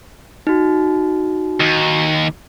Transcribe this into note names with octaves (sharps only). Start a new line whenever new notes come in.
D#4 F#4
D#2